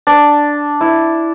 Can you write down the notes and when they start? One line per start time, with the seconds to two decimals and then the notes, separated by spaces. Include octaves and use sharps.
0.07 D4
0.81 E4